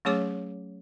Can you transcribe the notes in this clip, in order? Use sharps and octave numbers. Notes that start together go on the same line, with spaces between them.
F#3 A3 C#4 G#4 C#5 D6